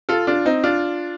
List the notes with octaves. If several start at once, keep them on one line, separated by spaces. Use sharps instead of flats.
F4 A4
D4 F4
C4 D#4
D4 F4